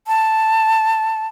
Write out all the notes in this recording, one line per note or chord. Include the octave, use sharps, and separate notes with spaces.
A5